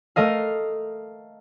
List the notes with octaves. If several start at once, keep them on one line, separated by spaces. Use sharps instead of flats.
A3 A#4 D#5 F5